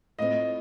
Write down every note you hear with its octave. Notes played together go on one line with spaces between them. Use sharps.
A2 A3 C4 F4 D#5